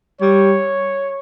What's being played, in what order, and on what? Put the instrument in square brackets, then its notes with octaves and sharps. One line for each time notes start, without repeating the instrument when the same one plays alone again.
[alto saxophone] G3 [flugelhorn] C#5